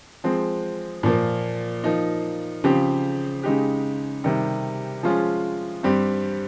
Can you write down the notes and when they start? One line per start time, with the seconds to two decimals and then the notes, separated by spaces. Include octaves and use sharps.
0.24 F3 G#3 C4
1.03 A#2 F3 A#3
1.84 F3 A#3 D#4
2.64 C#3 F3 C4 G4
3.43 C#3 G#3 D#4 G4
4.24 C3 D#3 G3
5.03 F3 G#3 C#4 F4
5.83 G2 G3 C4 G4